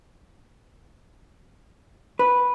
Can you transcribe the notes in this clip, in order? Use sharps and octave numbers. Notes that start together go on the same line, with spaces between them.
B4